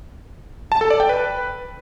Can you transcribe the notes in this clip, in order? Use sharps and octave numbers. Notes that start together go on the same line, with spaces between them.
A5
A4
D5
G5
B4